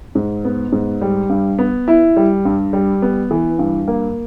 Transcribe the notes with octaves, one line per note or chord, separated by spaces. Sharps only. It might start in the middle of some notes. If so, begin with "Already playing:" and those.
G#2
B3
G#2
G3
G2
B3
E4
G3
G2
G3
B3
E3
G2
A#3